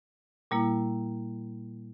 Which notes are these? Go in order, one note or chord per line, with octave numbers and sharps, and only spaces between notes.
A#2 G3 A#3 E4